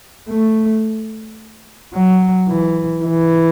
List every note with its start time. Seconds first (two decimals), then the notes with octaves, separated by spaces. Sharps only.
0.30 A3
1.94 F#3
2.49 E3
3.04 E3